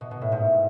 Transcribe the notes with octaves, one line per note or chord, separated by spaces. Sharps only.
B2
B2
A2
G#2